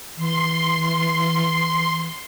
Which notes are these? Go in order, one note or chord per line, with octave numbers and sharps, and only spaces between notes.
E3 C6